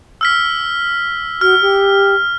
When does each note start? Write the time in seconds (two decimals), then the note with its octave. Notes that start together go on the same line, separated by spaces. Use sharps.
0.21 E6 F6 B6
1.41 F#4 F6
1.61 G4